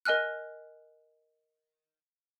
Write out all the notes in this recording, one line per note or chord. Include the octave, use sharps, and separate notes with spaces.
A#4 D#5 G#5 F6 F#6